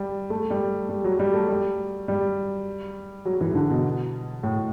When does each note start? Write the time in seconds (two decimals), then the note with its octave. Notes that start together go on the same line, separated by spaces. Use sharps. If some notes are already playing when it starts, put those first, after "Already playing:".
Already playing: G3
0.30 A3
0.50 G3
0.89 G3
1.04 F#3
1.19 G3
1.34 A3
1.49 G3
2.08 G3
3.25 F#3
3.41 E3
3.51 E3
3.55 D3
3.70 B2
4.43 A2